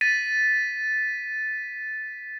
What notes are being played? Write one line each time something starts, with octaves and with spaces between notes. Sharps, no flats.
A6 B6 D#7